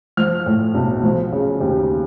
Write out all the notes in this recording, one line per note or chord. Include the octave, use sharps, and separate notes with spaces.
F3 F6
A2
B1
F3
C#3
D#2